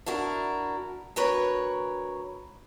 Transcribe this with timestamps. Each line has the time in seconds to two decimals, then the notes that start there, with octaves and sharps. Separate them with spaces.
0.06 D4 E4 F#4 A#4
1.16 D2 A#4 B4 C#5